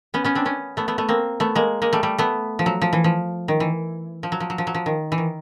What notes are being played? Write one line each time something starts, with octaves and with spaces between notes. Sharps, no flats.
B3 C#4
B3 C#4
C4 D4
B3 C#4
A3 B3
A3 B3
A3 B3
A#3 C4
A3 B3
G#3 A#3
G#3 A#3
G3 A3
G3 A3
A3 B3
F3
F#3
F3
E3
F3
D#3
E3
F3
F#3
F3
F#3
F3
F#3
F3
D#3
E3
D#3